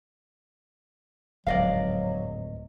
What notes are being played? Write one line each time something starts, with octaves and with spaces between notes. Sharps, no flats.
D1 F2 G#2 F#3 D5 D#5 F5